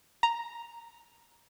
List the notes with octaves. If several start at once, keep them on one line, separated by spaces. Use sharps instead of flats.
A#5